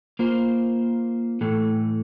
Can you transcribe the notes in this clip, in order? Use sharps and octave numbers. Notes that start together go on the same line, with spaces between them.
A#3 F4 C5
A2 E3 A3